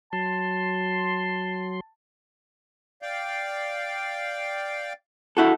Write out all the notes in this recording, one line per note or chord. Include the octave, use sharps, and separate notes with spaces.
F#3 A5 C6
D5 F5 G5
E4 F#4 A4